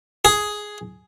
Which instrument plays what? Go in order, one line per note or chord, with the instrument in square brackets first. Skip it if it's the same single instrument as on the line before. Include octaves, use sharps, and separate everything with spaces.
[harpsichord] G#4